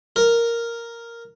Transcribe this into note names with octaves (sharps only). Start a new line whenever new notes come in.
A#4